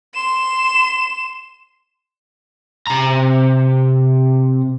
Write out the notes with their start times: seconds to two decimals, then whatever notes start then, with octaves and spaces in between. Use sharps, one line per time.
0.15 C6 E7
2.87 C3 A#5